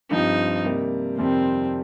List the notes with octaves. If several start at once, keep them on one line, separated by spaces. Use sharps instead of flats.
G2 F3 C4 D#4 G4
C3 G3 A#3
F2 C3 D#3 G3 C4